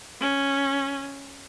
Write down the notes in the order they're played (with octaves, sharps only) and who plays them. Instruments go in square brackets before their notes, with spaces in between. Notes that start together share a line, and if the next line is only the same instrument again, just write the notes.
[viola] C#4